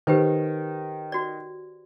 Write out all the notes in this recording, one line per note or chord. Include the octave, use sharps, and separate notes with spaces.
D#3 G4 B4 C5
F#4 D5